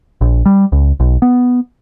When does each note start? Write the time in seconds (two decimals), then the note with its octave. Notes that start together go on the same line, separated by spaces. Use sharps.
0.21 A#1
0.46 G3
0.72 C#2
1.00 B1
1.22 B3